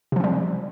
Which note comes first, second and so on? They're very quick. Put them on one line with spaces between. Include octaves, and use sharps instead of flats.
C3 F3 C4 G3